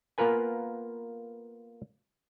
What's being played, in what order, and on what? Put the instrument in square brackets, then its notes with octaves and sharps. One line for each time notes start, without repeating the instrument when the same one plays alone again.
[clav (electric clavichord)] A#3 B3 F4 A#4 B4 G#5